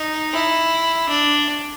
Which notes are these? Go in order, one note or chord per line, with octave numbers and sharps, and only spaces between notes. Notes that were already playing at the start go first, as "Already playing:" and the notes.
Already playing: D#4
E4
D4